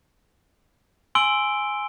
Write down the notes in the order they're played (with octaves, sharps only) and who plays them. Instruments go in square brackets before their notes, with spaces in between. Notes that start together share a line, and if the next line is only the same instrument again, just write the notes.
[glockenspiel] G#5 C6 E6 D7 G7